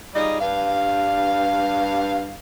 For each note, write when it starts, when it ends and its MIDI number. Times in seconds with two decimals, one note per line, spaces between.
0.15 0.37 55
0.15 0.37 63
0.15 0.37 65
0.15 0.37 68
0.15 0.37 74
0.15 0.37 75
0.41 2.35 43
0.41 2.35 77